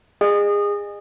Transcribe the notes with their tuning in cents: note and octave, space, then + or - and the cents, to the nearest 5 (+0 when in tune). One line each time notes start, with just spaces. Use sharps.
G#4 -25 D#5 -35